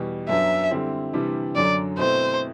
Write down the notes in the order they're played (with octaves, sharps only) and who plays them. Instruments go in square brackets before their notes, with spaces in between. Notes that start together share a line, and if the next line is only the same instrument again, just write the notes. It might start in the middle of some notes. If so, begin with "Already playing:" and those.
Already playing: [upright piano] E2 B2 G3
[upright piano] F#2 F#3 B3 D4 [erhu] E5
[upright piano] D3 G3 C4 E4
C3 E3 G3 D4
[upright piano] F#2 D3 F#3 [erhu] D5
[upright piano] B2 A3 C4 E4 [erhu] C5